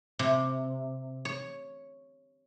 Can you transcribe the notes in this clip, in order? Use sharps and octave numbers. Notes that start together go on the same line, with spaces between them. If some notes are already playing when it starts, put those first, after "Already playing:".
C3
C#5